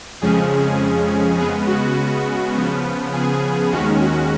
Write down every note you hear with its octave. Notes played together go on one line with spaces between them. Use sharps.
F2 C#3 F3 G#3 C#4 G#4
C#3 G#3 B3 G#4
F#4
C#3 F3 B3
G#4
D#2 D#3 G#3 C#4 F#4
F#4